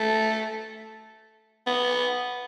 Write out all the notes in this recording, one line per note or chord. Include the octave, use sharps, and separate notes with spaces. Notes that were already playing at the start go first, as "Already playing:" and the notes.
Already playing: A3
B3